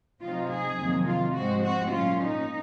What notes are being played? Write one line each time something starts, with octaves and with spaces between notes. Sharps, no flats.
C3 F#3 C4 D#4 F4
G#4
F2 C3 D#3 F#3 A#3
F4
G#2 F3 G#3 C4 F#4
F#4
A#2 F#3 C#4 F4
D#4